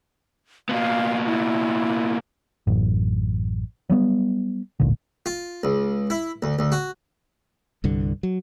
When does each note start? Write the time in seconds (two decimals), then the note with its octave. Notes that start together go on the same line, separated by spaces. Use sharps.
0.69 A#2 B3 F5
1.26 E4
2.67 A1 F#2
3.90 F#3 G3 B3
4.80 D1 G#1 A#2 D3
5.26 F4
5.63 C#2
6.10 E4
6.42 D2
6.59 D2
6.72 F#4
7.84 C2 G2 D3
8.23 F#3